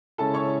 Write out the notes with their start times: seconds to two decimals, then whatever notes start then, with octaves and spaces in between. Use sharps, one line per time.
0.18 C#3 G#3 C#4 E4 A4 A5
0.34 C#5 C#6